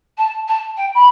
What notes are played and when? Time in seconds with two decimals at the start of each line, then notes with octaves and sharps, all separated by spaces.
0.18 A5
0.48 A5
0.77 G5
0.94 B5